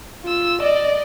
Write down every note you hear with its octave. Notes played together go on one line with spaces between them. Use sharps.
F4 E6
D5 D#5